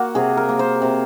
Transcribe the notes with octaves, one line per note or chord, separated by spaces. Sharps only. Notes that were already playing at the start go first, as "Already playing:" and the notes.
Already playing: A#3 F#4
C3 G#4
A#4
A#3
C5
C3